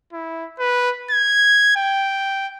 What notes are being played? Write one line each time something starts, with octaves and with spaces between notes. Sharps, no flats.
E4
B4
G#6
G5